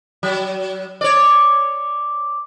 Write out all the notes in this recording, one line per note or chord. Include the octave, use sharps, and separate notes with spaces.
F#3
C#5 D5